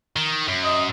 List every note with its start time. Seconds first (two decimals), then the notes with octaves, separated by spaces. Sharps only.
0.16 D#3
0.48 F#2
0.64 D#5